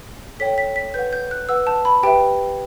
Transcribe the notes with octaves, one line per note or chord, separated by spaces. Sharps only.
A4 C#5 G5 B6
B6
B6
B4 F#5 G6
G6
F#6
B4 F#5 E6
A5
B5
G4 B4 E5 G5